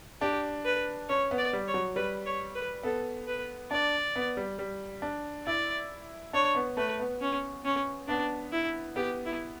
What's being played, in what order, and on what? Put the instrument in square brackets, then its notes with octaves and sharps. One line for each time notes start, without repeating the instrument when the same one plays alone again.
[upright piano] D4 [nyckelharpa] G4
[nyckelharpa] B4
[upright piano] C#4 [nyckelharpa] C#5
[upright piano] B3
[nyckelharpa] D5
[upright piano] G3
[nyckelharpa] C#5
[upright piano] F#3
[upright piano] G3 [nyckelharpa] B4
[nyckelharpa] C#5
B4
[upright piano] B3 [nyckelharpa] A4
[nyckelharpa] B4
[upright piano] D4 [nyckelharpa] D5
[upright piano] B3
G3
G3
D4
[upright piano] E4 [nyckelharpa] D5
[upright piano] D4 [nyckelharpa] C#5
[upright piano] B3
[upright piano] A3 [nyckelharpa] B4
[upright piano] B3
[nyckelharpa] C#4
C#4
[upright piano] B3 [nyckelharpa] D4
[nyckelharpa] E4
[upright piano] B3 [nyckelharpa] G4
[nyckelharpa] E4